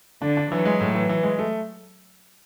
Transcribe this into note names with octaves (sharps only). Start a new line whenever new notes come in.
D3 D4
D4
E3 F#3
G#3
A2
E3
E3
G#3
A3